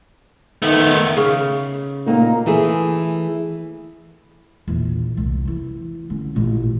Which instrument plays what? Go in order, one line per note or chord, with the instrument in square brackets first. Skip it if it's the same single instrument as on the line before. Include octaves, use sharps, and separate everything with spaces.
[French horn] D#3 [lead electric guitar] A3 B3
[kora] C#3
[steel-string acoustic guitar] A#2 A#3 D#4
[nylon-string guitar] E3 A3 G#4
[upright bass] A#1 E2
C2
E3 E4
D3 C#4
A1 A#2